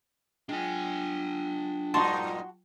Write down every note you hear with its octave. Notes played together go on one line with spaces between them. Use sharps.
F#3 G#3 D4 F4 G5 G#5
G2 A#2 D#4 F#4 A5 C6